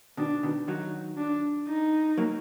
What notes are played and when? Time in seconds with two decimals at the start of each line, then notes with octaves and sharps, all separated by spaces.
0.17 B2 D#3 D4
0.43 B2 D#3
0.68 D#3 F#3 D#4
1.18 D4
1.68 D#4
2.17 F#3 A#3